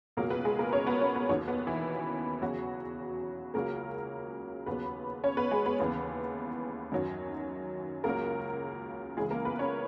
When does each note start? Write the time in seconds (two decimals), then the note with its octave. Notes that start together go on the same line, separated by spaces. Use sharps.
0.17 C#2 B2 F#3 A#3 A#4
0.30 B3 B4
0.45 G#3 G#4
0.59 A#3 A#4
0.73 C#4 C#5
0.87 B3 B4
1.01 C#4 C#5
1.15 B3 B4
1.29 D#2 D#3 F#3 C#4 C#5
1.48 B3 B4
1.67 E3 E4
2.42 E2 C#3 F#3 F#4
3.54 C#2 C#3 F#3 A#3 A#4
4.66 D#2 C#3 F#3 B3 B4
5.24 C#4 C#5
5.37 B3 B4
5.51 G#3 G#4
5.66 B3 B4
5.79 D#2 C#3 E3 B3 B4
6.92 F#2 D#3 F#3
8.04 C#2 C#3 F#3 A#3 A#4
9.17 C#2 C#3 E3 G#3 G#4
9.31 A#3 A#4
9.45 B3 B4
9.59 C#4 C#5